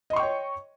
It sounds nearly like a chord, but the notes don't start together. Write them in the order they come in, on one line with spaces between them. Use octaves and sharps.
D#5 C6 C#6 G5 C#5